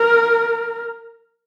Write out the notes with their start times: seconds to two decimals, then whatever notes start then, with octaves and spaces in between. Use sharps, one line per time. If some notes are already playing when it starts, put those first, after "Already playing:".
Already playing: A#4